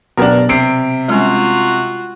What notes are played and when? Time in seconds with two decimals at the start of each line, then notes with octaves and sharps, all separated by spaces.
0.17 B2 F#3 B3 D4 G4 A#4
0.49 C3 C7 D7
1.08 G3 G#3 C#4 F4 F#4